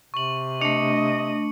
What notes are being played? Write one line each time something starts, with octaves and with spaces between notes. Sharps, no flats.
C3 C#6 F#7
A3 D4 D#5 C#7